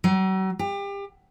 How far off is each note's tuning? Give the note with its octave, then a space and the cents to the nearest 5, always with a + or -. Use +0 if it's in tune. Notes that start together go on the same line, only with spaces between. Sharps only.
F#3 +40
G4 +30